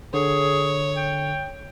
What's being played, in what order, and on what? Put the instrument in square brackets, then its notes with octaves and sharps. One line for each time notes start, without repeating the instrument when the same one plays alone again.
[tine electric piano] D3 [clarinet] G#4 [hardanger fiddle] C#5
[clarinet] G5